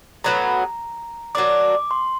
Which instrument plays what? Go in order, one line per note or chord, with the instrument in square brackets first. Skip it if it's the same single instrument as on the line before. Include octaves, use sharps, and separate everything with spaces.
[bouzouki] A2 F#3 B3 [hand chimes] A#5
[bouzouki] F#3 A#3 D4 [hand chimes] D6
[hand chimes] C6